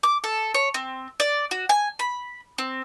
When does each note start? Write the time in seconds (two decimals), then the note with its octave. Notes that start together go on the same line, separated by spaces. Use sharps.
0.03 D6
0.24 A4
0.54 C#5
0.74 C4
1.20 D5
1.51 F#4
1.69 G#5
1.99 B5
2.58 C4